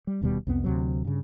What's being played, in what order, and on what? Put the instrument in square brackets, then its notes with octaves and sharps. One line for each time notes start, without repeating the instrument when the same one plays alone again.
[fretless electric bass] G3
E1 D#2 B2 G3
C2 F2 B3 C4
D2 C3 F#3
G2 C#3